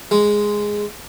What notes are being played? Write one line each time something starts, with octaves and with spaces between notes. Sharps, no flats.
G#3